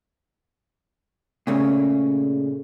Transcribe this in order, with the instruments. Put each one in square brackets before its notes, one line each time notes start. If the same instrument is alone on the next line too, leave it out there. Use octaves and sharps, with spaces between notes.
[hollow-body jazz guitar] A#2 C#3 A3 A#3